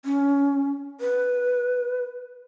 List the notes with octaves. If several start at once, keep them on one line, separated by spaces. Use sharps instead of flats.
C#4
B4